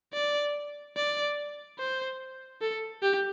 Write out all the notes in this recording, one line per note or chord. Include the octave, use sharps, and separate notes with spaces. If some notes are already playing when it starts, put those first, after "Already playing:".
D5
D5
C5
A4
G4